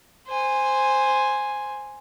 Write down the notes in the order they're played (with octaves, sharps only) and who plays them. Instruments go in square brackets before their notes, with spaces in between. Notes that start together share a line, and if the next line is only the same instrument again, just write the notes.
[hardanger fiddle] C5 G#5